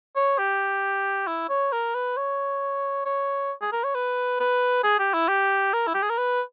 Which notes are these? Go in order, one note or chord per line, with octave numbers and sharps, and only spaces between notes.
C#5
G4
E4
C#5
A#4
B4
C#5
C#5
G#4
A#4
C#5
B4
B4
G#4
G4
E4
G4
A#4
E4
G4
G#4
A#4
B4